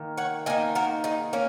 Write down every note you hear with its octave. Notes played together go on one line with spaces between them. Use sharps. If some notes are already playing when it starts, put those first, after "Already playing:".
Already playing: D#3 A#3
C#5 F#5
D#3 A#3 D#5 G#5
F#4 A#4
D#4 G#4
A#3 C#4